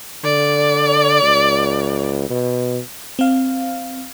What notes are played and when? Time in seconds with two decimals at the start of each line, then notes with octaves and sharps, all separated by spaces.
0.24 D3 D5
1.22 C#2
2.30 B2
3.19 C4 F5